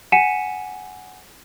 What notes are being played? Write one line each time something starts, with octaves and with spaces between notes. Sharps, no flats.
F#5 G#5 B6 C#7 D#7 E7